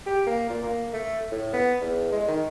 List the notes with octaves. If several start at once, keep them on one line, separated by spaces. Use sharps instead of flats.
G4
A#3
A#2
A#3
A3
A2
B3
E2
G#3
D#3